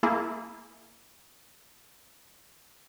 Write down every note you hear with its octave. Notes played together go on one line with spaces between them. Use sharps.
A#3 E4 G#4